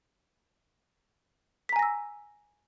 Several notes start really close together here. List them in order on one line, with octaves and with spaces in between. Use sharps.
B6 A#5 G#5 A#6 E6